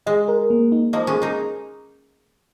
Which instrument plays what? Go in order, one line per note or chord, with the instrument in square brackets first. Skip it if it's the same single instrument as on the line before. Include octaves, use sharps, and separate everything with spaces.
[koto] G#3 [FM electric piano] D#5
[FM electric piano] A#4
A#3
D#4
[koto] F3 A#3 [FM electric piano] D#5
[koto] G#3 C#4
[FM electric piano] G#4
[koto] A#3 D#4